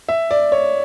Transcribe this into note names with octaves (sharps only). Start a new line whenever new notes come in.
E5
D5
C#5